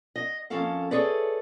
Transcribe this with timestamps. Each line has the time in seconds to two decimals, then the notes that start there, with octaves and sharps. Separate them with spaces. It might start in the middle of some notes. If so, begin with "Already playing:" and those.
0.16 D#5
0.50 F2 A#3 C#4 A4 F5
0.91 G#4 A4 B4 C#5 D5 E5